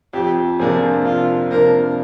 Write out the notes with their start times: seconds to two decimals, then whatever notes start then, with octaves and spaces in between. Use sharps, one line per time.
0.13 F2 G4
0.59 C3 F3 A#3 D4 G#4
1.05 F2 F4
1.51 C3 F3 A#3 D4 A#4